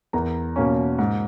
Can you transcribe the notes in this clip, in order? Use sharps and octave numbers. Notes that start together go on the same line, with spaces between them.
E2 A#4 A#5
B2 A#3 C#4
G#2